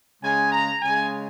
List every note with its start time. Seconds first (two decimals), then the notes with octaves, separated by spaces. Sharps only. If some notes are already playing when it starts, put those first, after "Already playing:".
0.23 C#3 G#3 G#5
0.52 A#5
0.81 C#3 G#3 G#5